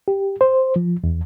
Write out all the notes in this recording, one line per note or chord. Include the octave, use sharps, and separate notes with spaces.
G4
C5
F3
E2